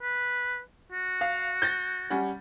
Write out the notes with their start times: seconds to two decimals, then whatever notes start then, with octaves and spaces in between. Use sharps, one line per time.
0.02 B4
0.92 F#4
1.21 F5
1.62 G6 A6 A#6
2.10 G3 C#4 F#5